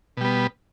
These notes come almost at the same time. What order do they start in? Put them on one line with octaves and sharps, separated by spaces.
B2 G3 B3